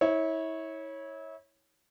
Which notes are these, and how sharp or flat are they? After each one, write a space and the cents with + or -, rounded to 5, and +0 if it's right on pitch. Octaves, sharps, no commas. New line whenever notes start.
E4 -30 C#5 -10